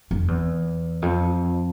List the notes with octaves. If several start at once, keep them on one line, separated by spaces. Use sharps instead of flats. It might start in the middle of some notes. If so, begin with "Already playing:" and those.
F2
E2
F2